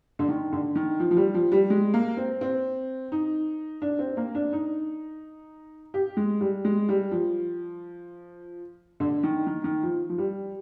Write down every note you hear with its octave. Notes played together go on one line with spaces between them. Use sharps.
D3
D#3
D3
D#3
F3
F3
G3
F3
G3
G#3
A#3
C4
C4
D#4
D4
C4
A#3
D4
D#4
G4
G#3
G3
G#3
G3
F3
D3
D#3
D#3
D#3
F3
F3
G3